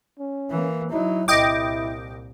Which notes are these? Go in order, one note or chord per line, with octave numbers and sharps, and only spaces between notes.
C#4
E3 A#3
F#3 D#4 E4
C2 A#2 E4 D#5 G5 D6